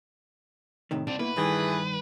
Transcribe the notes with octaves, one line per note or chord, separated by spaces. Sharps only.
A2 C3 D#3
C2 C4 D4
B2 A#3 E4 B4
G2 D#3 E3 A3 G#4